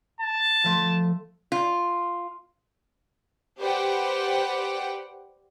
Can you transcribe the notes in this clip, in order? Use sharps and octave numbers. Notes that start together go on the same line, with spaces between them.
A5
F3 A3
F4
G4 B4 C5 D5 F#5 G5